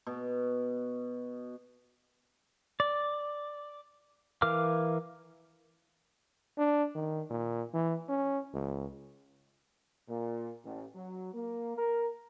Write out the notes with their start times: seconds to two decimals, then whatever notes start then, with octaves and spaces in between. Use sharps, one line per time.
0.07 B2
2.80 D5
4.42 E3 A#4 F5 D6 F6
6.57 D4
6.95 D#3
7.30 A#2
7.73 E3
8.08 C#4
8.53 C#2
10.09 A#2
10.65 A1
10.95 F#3
11.34 A#3
11.77 A#4